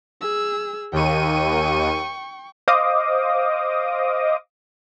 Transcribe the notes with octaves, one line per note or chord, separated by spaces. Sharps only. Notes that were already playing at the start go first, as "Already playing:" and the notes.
G#4 E6
D#2 G5 C#6 D#7
C5 D#5 F5 D6 D#6